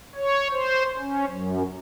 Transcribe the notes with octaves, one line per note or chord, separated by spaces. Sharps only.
C#5
C5
C#4
F#2